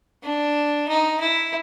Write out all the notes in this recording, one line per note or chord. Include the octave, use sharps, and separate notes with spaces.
D4
D#4
E4